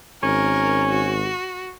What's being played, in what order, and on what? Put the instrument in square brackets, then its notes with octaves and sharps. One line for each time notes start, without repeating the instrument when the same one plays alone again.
[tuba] G#1 [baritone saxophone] C#4 [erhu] A#4
[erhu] F#4